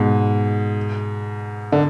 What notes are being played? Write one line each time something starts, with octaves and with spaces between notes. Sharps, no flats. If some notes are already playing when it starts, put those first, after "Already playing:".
Already playing: G#2 B2
D3